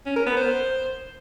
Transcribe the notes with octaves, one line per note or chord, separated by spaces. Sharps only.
C#4
A#4
B3
C5